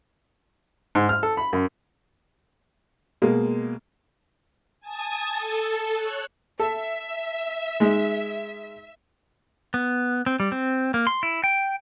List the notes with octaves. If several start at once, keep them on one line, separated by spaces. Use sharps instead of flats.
G#2
F6
A4
B5
F#2
B2 G#3 A#3
G#5 A5 D#6 G#6 A6
A4
C#5 F#6
A4 E5
G#3 D#4
B3
C4
G3
C4
A#3
C6
E4
G5